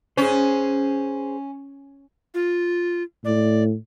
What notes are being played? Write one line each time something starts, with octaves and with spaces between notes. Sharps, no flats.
C#4 G#4 C5
F4
A2 D5